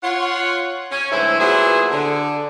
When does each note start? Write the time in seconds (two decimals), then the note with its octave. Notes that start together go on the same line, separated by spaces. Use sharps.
0.02 F4 C#5 F#5
0.91 C#4
1.11 D2 G#2 E3 F#3 E4 C5
1.40 A#2 F#3 B3 E4 G#4 C5
1.91 D3